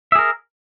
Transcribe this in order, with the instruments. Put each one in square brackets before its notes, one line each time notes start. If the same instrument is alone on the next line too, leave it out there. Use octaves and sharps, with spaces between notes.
[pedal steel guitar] E5
G#4
A#4